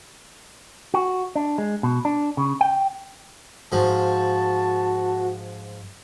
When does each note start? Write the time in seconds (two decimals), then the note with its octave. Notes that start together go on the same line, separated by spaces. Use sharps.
0.94 F#4
1.36 D4
1.58 G#3
1.83 B2
2.05 D4
2.37 C#3
2.61 G5
3.72 G#2 F3 F#4 A5